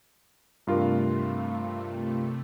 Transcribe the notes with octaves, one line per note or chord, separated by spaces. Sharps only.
G2 C3 A3 F4 A#4